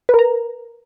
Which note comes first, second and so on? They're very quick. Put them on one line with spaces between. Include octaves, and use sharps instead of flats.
B4 A#4 A#5